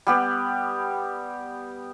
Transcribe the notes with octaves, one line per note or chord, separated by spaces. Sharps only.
G3 B3 G4